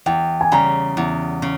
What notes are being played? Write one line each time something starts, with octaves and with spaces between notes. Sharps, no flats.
E2 G5
G#5
C#3 G3 A#5
E2
C#3